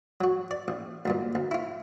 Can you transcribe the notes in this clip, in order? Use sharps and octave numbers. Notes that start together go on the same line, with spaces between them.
F#3 F#4
D5
A1
D2 G2 A#2
D2
E4 F4